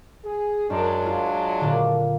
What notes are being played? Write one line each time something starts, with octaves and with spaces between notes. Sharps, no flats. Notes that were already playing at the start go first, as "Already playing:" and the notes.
G#4
F#2 F#3 G#3 D4
F4
A#2 D3